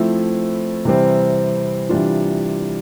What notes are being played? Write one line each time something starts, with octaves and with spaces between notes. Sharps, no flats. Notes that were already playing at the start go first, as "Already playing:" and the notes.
Already playing: F3 A3 C4 E4
C3 E3 G3 C4
C3 E3 G3 D4 F4